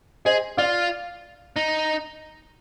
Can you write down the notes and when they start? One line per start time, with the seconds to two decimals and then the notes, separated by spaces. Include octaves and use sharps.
0.25 G#4 C5 D#5
0.57 F4 D5 F5
1.56 D#4